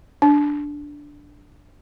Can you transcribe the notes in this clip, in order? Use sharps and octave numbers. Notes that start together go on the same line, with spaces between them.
D4